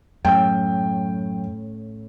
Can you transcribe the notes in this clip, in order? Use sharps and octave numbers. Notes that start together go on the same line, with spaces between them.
F#2 A2 C#4 G5 E6